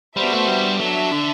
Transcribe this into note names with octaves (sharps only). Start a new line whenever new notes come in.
G3 B3 D4 F#4 C5 E5
A3
G3
F#3 D4 A4 E5
D3